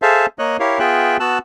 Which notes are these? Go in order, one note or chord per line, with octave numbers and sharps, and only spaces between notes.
G#4 A4 C5 E5 F5 A5
A#3 C#5 D#5 F#6
E4 G4 A#4 C#5 F5
B3 F4 G#4 E5 G5 F#6
B3 F#4 A5 E6 F#6